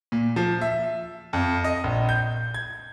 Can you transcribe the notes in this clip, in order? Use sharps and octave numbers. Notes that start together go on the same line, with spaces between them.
A#2
F3
E5
F2
D#5
A#1
G6
G#6